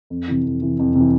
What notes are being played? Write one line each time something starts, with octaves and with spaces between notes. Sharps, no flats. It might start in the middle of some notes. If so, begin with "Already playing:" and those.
F2
C3 E3
F2
C3 E3
F2
C3
E3